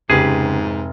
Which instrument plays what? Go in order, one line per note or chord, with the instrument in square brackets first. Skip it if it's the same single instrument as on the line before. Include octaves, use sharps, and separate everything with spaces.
[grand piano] F1 [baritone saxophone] G#2 [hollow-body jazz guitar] C#3 G4 B4 [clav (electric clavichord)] G#4